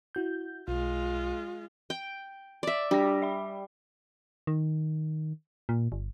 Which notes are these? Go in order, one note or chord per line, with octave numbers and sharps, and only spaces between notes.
E4 F#4 G6
B1 G#3 F4
G5
D5 E5
G3 D4 A#6
E5 B5
D#3
A#2
G1